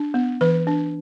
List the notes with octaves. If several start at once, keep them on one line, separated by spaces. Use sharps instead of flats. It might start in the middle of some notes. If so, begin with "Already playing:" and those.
Already playing: D4
B3
E3 B4
D4